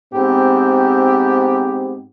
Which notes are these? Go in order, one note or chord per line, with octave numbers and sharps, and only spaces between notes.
G#2 B3 C4 G4